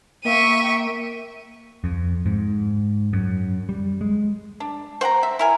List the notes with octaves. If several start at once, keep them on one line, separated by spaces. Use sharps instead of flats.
A#3 E5 G5 C#6 D#7
F2
G#2
F#2
G3
G#3
D4
C5 F#5 G5 A#5
E5
E4 A#4 G#5